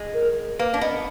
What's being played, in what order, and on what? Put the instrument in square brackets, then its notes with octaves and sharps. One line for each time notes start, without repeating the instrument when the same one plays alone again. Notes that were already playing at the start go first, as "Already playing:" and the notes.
Already playing: [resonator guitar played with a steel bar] G#3
[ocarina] A#4
[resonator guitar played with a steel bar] A#3 [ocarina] B4
[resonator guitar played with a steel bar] D4
[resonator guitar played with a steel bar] B3 [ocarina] D#5